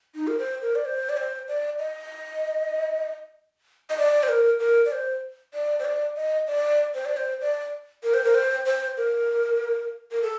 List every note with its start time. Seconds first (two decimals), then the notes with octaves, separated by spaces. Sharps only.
0.15 D#4
0.27 A#4
0.39 C5
0.62 A#4
0.75 D5
0.86 C5
1.09 D5
1.17 C5
1.48 D5
1.79 D#5
3.90 D#5
3.98 D5
4.23 C5
4.29 A#4
4.60 A#4
4.86 D5
4.92 C5
5.54 D5
5.79 C5
5.85 D5
6.16 D#5
6.47 D5
6.94 C5
7.06 D5
7.17 C5
7.41 D5
8.03 A#4
8.14 C5
8.24 A#4
8.35 C5
8.66 C5
8.97 A#4
10.12 A#4
10.22 A4